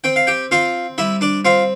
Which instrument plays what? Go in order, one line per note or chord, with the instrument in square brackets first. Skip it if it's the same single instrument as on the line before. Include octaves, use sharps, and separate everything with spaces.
[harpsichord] C4 G5
F5
G4 G5
C4 F4 F5
G3 E4 E5
D4 D5
C4 F4 F5